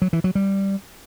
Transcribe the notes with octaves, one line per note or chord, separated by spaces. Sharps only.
F#3
E3
F#3
G3